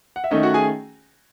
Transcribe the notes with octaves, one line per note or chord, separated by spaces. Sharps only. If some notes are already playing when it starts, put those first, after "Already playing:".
F#5
E5
D#3 A3 C#4 D#4 D#5
F#4 F#5
G#4 G#5